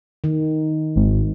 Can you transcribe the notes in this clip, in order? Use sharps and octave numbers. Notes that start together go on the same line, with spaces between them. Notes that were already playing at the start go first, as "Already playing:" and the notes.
D#3
G#1